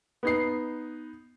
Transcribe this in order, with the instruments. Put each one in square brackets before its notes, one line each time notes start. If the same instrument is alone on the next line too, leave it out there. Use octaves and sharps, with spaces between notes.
[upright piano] B3 D#4 C7